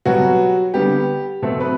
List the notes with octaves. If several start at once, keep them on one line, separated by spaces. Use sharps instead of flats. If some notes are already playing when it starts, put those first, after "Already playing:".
B2 F#3 G3 B3 F#4
D3 G3 B3 G4
B2 F#3 A3 C4 A4
B3 B4